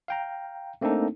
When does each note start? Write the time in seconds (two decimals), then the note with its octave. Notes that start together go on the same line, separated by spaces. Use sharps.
0.08 F5 G5 A#5
0.81 A3 A#3 C4 D4 D#4 A4